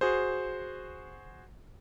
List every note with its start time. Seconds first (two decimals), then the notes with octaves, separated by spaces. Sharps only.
0.01 F#4 G#4 C5